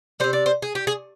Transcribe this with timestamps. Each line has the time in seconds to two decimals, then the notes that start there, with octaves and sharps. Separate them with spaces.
0.20 C3 G3 C5
0.33 D5
0.46 C5
0.62 G#4
0.75 G4
0.87 G#4